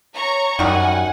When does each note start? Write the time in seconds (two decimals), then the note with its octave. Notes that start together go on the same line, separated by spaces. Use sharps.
0.14 C#5 A#5 C#6
0.59 F#2 D#3 G3 F#4 F#5 G#5